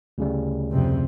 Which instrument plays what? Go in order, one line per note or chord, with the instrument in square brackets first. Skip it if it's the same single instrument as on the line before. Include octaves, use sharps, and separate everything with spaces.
[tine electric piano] D2 C#3 G3
[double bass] F2 C3